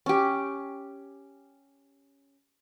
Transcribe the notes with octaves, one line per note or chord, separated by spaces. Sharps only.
C#4 G4